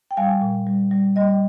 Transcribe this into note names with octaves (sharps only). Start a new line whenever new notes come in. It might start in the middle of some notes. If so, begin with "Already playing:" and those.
G5
G3 F5 G#5
A#2
G3
G3
G3 D#5 G5